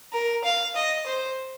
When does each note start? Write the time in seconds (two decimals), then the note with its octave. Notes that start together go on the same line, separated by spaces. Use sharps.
0.13 A#4
0.44 F5
0.76 D#5
1.07 C5